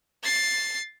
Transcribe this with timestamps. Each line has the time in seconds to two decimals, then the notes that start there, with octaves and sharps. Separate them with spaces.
0.23 A6 C7